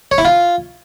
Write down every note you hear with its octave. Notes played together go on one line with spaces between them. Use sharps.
C#5
E4
F4